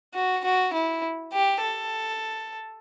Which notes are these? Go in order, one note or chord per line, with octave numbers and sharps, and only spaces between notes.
F#4
F#4
E4
G4
A4